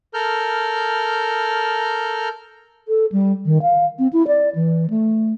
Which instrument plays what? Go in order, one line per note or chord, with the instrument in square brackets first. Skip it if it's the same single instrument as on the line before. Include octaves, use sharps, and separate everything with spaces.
[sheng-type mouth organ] A4 A#4 F6 G6
[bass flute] A4
G3
D#3
F5
C4
E4
D5
E3
A3